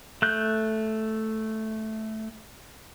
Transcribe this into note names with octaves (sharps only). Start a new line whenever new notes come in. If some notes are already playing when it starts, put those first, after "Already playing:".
A3 F#6 G6